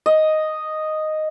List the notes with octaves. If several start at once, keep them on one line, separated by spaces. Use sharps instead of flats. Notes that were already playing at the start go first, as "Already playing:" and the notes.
D#5